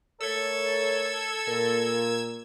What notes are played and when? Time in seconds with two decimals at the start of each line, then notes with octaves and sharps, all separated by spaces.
0.21 A3 A4 A#4 C#5 E6 G#6
1.48 A#2 A#4